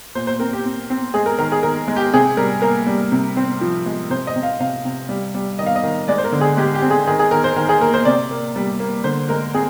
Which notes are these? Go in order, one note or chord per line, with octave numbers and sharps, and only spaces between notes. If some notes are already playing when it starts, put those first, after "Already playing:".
A#2 C5
C5
C4 A#4
G4
C4
C4
G#3 G#4
A#4
D#3 A#4
G#4
D#3 A#4
G#3
G4
C3 G#4
G3 A#4
A#3 A#4
G3
C3
C4
F3
G#3
C3 C5
D#5
C3
F5
C3 F5
C3
G3
G3
D#3 D#5
F5
D#5
D#3
G#3 D5
C5
A#4
D3
G#4
G#3 G4
G4
C4
G#4
D#3 G#4
G#4
D#3 A#4
C5
D#3 A#4
G#4
A#3 A#4
C5
C3 D5
A#3
G3
A#3
D3 C5
G#3 A#4
C4 G#4